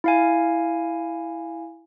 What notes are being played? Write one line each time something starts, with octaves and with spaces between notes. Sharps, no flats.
E4 F5 G#5